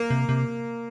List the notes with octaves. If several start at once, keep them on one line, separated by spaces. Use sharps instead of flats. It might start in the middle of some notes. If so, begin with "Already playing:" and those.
Already playing: A#3
C3
C3